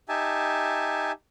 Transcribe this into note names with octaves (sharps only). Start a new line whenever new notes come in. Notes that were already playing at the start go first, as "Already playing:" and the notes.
D#4 G4 E5 G#5 A5